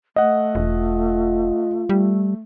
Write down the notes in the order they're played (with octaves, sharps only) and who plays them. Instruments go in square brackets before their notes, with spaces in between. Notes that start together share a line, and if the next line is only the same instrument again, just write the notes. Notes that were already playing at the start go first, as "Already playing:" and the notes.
[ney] A3 [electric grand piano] D#5 F#5
[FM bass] E1 [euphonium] F4
[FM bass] G3 [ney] A3